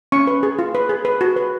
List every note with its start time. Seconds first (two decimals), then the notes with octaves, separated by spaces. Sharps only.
0.12 C#4 C#6
0.27 B4
0.43 G#4
0.59 F4
0.75 B4
0.89 G#4
1.05 B4
1.21 F#4
1.36 B4